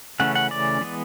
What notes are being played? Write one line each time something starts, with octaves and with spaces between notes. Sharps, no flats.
C#3 E3 A3 C#4 F#5
F#5
D5
E3 G#3 B3